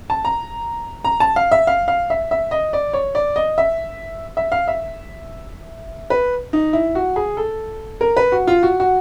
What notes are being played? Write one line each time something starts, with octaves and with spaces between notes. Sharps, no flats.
A5
A#5
A#5
A5
F5
E5
F5
F5
E5
E5
D#5
D5
C#5
D5
D#5
E5
E5
F5
E5
B4
D#4
E4
F#4
G#4
A4
A#4
B4
F#4
F4
F#4
F#4